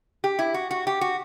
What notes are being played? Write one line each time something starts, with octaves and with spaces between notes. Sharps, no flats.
G4
E4
F#4
F#4
G4
F#4